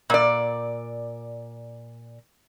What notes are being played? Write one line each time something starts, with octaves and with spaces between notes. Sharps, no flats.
A#2 D5